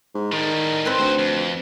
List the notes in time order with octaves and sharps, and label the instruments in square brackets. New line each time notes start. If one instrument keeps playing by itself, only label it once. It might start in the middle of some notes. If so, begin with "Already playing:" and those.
[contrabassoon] G#2
[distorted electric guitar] A2 G3 [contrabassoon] D#3
[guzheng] C4 B4 G#5
[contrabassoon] D2 [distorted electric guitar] F#4 C5
[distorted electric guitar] F2